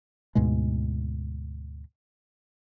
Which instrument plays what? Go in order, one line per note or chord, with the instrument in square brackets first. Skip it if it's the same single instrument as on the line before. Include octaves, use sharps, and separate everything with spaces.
[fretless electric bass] D2 G#2 B2 G#3